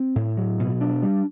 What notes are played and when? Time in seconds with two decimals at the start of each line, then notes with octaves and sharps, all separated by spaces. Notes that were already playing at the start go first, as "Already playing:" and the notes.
Already playing: C4
0.16 A2
0.37 F#3
0.60 B2
0.81 D4
1.03 G3